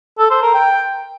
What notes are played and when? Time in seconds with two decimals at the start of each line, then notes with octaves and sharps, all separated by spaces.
0.19 A4
0.31 C5
0.42 A#4
0.54 G5